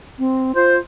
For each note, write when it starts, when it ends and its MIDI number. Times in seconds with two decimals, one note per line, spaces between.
0.19 0.52 60
0.55 0.79 65
0.55 0.75 72